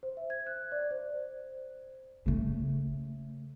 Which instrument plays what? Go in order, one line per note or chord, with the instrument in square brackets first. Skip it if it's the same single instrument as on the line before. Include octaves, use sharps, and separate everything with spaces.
[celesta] C5
E5
G#6
F#6
D5
C5
[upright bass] C#3 A3